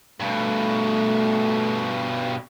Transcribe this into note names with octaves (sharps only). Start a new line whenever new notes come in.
G2 B2 A3